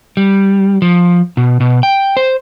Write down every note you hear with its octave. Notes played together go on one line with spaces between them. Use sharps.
G3
F3
B2
B2
G5
C5